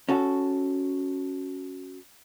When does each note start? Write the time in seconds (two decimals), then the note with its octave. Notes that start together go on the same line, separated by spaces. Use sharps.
0.09 C#4 F#4 A4